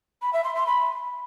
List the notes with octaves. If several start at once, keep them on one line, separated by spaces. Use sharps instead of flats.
B5
E5
C6
C6
B5